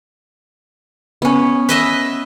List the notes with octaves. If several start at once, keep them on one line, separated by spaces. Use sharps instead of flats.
B3 C#4
B4 D#5 E5